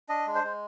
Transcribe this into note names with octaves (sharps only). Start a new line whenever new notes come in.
D4 D#5
G#3
C5
G#3